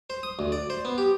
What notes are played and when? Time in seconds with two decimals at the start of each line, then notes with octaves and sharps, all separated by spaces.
0.10 C5
0.23 D#6
0.39 D2
0.52 D5
0.70 C5
0.85 B3
0.98 G4